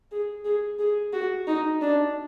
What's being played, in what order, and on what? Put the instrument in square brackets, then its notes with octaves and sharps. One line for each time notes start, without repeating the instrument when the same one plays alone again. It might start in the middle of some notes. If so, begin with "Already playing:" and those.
[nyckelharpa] G#4
G#4
G#4
F#4
D#4
D4